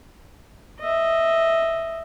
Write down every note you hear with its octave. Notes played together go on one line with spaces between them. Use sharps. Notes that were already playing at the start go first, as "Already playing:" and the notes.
D#5 E5